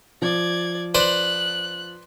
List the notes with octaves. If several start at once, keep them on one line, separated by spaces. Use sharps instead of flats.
F3 D5 G#6
B4 C5 D5 F#6